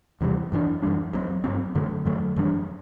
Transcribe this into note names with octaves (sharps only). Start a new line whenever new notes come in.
E2 C3 E3 G3
F#2 E3 G3 D4
F#2 E3 G3 D4
G2 F#3 C4
G2 F#3 C4
F#2 D3 F#3 A3
F#2 D3 F#3 A3
F#2 E3 G3 D4